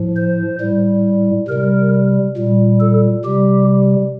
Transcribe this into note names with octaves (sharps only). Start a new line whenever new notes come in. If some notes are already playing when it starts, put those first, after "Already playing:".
Already playing: A2 F3
C5
A2 G3
C3 G3 A#4
A#2 G3
A4
C3 G3 G4